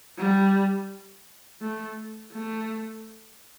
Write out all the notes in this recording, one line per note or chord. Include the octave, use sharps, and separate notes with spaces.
G3
A3
A3